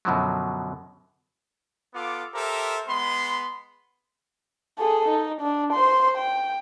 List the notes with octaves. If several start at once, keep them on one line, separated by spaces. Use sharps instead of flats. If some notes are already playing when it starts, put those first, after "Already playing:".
F#2 B2 D3 F3 F#3
B3 F4 A4 D6
G4 A4 A#4 C5 E5
G#3 B3 B5 C6
G#4 A4
D#4
D4
C5 C6
G5